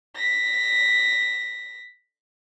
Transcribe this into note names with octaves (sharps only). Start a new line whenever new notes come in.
A#6 B6